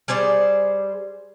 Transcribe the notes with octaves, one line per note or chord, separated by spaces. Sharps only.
G3 G#4 C5 D5